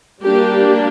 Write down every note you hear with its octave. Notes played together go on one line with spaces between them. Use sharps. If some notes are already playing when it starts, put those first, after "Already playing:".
G3 A#3 D4 G4